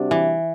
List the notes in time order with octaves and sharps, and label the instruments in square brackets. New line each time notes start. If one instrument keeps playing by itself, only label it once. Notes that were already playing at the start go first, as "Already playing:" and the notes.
Already playing: [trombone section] C3 G3 D4 F#4
[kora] E3